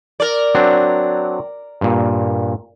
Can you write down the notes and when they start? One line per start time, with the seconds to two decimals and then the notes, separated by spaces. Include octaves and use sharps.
0.20 A#4 D5
0.55 F#3 C4 D4
1.81 G2 A#2